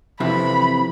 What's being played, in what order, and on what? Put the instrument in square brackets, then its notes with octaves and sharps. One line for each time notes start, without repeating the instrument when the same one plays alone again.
[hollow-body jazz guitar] F2 C3 E3 [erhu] B5